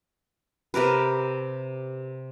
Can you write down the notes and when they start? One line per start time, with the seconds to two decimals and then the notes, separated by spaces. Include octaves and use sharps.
0.74 C3 G4 A#4 B4